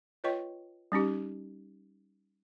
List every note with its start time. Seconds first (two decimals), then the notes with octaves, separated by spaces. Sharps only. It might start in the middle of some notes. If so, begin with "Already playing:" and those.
0.24 F4 B4 C#5 D#5 G5 C#6
0.92 G3 C#4 D#4 G4